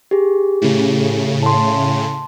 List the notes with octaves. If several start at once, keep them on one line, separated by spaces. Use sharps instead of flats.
G4 G#4
A2 C#3
A5 C6